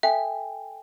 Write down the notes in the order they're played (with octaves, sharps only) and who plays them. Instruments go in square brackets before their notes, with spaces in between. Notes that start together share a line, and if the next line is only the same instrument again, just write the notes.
[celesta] A4 G5 G#5 [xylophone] E5